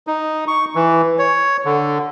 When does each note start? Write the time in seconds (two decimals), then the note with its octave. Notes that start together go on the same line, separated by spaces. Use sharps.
0.07 D#4
0.48 C#6
0.75 E3
1.19 C#5
1.65 D3